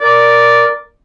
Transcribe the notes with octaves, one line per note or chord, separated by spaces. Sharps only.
A#4 D5